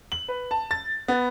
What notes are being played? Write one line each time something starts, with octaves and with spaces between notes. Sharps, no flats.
F#7
B4
A5
A6
B3